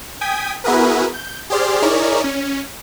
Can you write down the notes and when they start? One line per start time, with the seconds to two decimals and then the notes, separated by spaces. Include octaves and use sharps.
0.21 G5 G#5 D#6 G#6 B6
0.64 B3 E4 F#4 G#4 A#4 B4
1.14 G6
1.50 G4 G#4 C5 D5 C6 F6
1.82 D#4 E4 G#4 A#4 C#5 D5
2.24 C#4